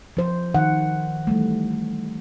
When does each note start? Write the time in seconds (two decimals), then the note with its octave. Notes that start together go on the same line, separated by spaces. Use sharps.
0.17 F3 C5
0.54 D#3 F#5
1.27 E3 G3 A3